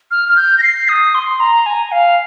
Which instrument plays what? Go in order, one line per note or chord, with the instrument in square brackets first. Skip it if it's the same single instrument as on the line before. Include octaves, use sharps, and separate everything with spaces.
[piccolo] F6
F6
G6
A#6
C7
D#6
C6
A#5
G#5
F5